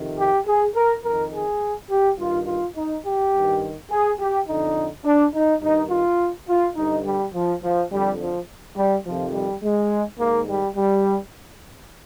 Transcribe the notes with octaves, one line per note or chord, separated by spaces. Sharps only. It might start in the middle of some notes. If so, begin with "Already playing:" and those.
Already playing: F2 C3 D#3
G4
G#4
A#4
F2 D#3 A#4
G#4
G4
G2 D#3 F4
F4
D#4
G4
G2 D#3
G#4
G4
F2 D3 D#4
D4
D#4
G2 D#3 D#4
F4
F4
G2 D3 D#4
G3
F3
F3
F2 D3 G3
F3
G3
F2 C3 D#3 F3
G3
G#3
G#2 D#3 A#3
G3
G3